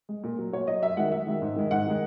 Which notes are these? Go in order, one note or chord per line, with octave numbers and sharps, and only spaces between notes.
G#3
A#2
F#3
A#2 C#5
F#3 D#5
F#2 E5
D#3 G#3 F#5
F#2 E5
D#3 G#3
G#2
D#3 G#3
G#2 F#5
D#3 G#3